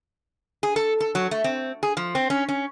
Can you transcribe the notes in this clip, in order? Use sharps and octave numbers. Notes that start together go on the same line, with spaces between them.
G#4
A4
A4
F#3
A3
C4
G#4
F3
C4
C#4
C#4